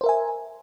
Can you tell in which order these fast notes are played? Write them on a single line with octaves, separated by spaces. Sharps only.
C5 A#4 E5 G#5